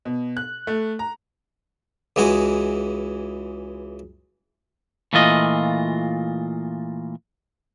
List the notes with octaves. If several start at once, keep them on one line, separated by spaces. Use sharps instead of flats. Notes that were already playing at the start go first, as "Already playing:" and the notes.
B2
F#6
A3
A#5
C#2 E3 G#3 F#4 G#5
A#2 E3 A3 F4 D#5